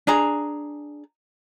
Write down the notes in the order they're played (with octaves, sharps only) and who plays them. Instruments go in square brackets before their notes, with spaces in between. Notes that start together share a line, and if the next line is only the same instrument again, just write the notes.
[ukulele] D4 G#4 A#5